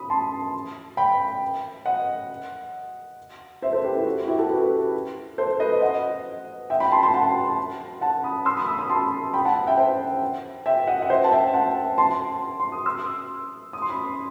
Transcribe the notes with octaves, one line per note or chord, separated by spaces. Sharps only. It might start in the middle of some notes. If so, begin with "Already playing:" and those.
Already playing: B5 D#6
A5 C6
G5 B5
D#5 F#5
C5 E5
A4 C5
G4 B4
E4
F#4
F#4
E4 G4
F#4 A4
G4 B4
A4 C5
B4 D#5
D#5 F#5
E5 G5
G5 B5
A5 C6
A5 C6
F#5 A5
F#5 A5
B5 D#6
C6 E6
B5 D#6
B5 D#6
B5 D#6
A5 C6
G5 B5
F#5 A5
E5 G5
C5 E5
E5 G5
D#5 F#5
F#5
C5 E5
A5
E5 G5
F#5 A5
A5 C6
C6
D#6
C6 E6
D#6
C6
B5 D#6